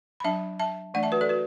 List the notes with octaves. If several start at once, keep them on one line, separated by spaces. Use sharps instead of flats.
B5
F#3 D4 E5 A5
E5 A5
E3 A3 D4 D5 F#5
E5 A5
F#4 B4
A4 D5
F#4 B4